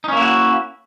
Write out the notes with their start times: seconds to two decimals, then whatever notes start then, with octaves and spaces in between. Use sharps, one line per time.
0.04 D#4
0.08 C#4
0.13 A#3
0.17 E4
0.21 F#4